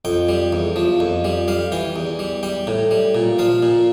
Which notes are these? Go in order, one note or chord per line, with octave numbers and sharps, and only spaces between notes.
F2 G5
G3
E2
F3
F2
G3
G3 F5
E3 G5
E2
G3
G3 G5
A2
G3
A#2
F3 F5
A#2